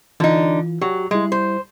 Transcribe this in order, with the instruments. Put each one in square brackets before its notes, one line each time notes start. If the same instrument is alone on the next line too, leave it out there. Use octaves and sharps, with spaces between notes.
[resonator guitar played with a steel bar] D3 D#4 [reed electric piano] E3 F4
[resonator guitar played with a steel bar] F#3 [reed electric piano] F#4 G4
[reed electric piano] G3 E4 [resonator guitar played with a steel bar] G#3
[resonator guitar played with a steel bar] C5